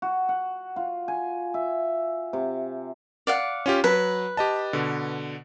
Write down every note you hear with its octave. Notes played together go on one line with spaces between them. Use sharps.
F#4
F#5
F4
G#5
E5
C3
D5 F5 F#5
C#4 F4 G4
F#3 B4
G4 D#5 A5
B2 D3